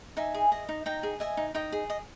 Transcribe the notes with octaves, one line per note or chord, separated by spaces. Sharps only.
D#4 E5 G#5
G#4
D#5
D#4
D#4 G5 A#5
G#4
D#5 E5 G#5
D#4
D#4 D#5 G5
G#4
D#5